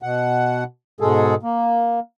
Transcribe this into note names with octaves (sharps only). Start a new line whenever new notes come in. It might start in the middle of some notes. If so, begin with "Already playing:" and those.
B2 F#5
G#2 B2 G#3 G#4 A4
A#3